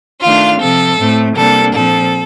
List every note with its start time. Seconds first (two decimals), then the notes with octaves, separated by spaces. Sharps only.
0.22 D#3 A3 D4 F4 F5
0.60 C3 F3 C4 A4
0.98 A2 A3 C4
1.36 C3 G3 A#3 D4 A4
1.74 A#2 F3 C4 A4